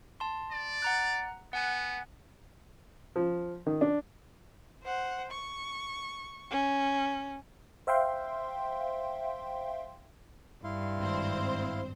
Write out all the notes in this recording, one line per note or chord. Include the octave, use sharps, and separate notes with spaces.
A5 C6
D5
F#5 A#5 F#6
B3 F#5 G#5 F#6
F3
D#3
D4
C5 F#5
C#6
C#4
C5 E5 F5 G5 C6
G2 E4 F5 C6
G#1 C4 C5